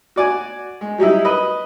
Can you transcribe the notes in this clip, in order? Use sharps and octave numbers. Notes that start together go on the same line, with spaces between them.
F#4 D5 G#5
G#3
F#3 G3 D#4 E4
B4 D#5